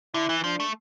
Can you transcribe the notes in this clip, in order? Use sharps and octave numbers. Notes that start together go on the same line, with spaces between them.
D3 E4
E3
F3 D4
A3